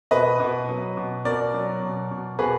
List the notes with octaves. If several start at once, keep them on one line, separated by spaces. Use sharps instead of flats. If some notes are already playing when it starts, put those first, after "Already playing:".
B2 B4 D#5
B2
F#3
B2
B2 A#4 D5
F#3
B2
B2
B2 G#4 B4